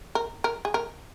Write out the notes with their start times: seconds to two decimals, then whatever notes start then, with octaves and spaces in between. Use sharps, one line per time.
0.15 A#4
0.44 A#4
0.65 G#4
0.74 A#4